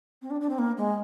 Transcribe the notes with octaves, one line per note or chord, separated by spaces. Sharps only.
C4
D4
D4
C4
A#3
G#3